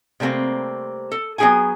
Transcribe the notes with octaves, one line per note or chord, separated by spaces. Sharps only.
C3 G3 A3 A#3 C4
A4
F#3 B3 D#4 G#4 G5 G#5